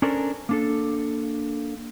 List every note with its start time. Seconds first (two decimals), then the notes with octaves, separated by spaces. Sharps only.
0.02 C#4 D4 A4 A#4 C5 D5
0.49 A#3 D4 A4